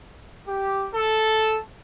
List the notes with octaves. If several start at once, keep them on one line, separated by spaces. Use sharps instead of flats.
G4
A4